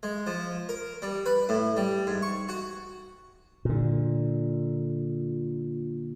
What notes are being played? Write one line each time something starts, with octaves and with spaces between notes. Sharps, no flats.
G#3
F3
A#4
G3
B4
A2
G3
G#2
C#6
F#4
A#2 D3